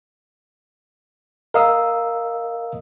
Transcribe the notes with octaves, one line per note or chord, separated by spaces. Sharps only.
A#4 D#5 F5 D#6 E6